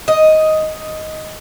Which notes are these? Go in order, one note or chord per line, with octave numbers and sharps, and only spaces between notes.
D#5